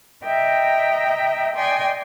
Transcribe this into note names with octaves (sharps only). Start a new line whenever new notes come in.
D#5 E5 G5 A#5
D5 D#5 G5 G#5 C6